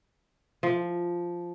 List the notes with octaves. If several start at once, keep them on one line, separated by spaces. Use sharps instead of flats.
F3